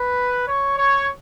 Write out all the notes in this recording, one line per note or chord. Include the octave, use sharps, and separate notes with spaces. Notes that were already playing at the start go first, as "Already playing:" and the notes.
Already playing: B4
C#5
C#5